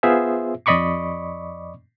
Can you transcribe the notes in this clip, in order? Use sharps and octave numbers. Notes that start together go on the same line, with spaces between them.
B3 F4 G#4 C5 E5
F2 D5 D#5 B5 C#6 D6